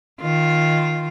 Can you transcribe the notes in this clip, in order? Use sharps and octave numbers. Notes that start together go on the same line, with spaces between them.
D#3 F4